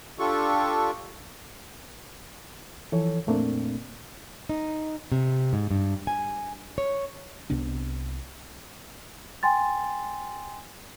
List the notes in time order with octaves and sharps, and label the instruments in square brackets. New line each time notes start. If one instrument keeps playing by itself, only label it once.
[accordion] D4 F4 G4 A4 C#6
[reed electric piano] E3 F3 A4 C#5
F2 A#2 A3 A#3 C4 D4
[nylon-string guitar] D#4
C3
G#2
G2
G#5
C#5
[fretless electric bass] C2 C3 B3 D4
[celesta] G5 G#5 C6 A6